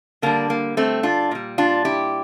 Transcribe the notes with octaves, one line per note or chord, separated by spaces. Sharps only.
D3 G3 A#3 D4
A#3
A3 C4
D4 F4
A#2 G3
D4 F4
E4 G4